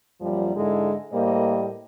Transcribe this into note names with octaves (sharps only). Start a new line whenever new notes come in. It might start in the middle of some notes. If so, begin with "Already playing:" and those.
F#2 A#2 F3 G3
G#2 D3 G#3 E4 A4
A2 G3 A#3 C5 D#5